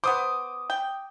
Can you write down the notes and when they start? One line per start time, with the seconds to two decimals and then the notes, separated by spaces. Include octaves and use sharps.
0.04 B3 C5 D6 D#6
0.70 G5